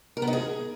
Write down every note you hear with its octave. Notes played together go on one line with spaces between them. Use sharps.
A#4
B3
D#4
G#4